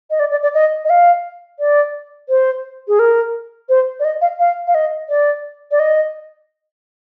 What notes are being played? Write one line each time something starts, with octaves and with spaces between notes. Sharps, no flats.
D#5
D5
D5
D5
D#5
D#5
F5
D5
C5
G#4
A#4
C5
D5
D#5
F5
F5
F5
D#5
D5
D5
D#5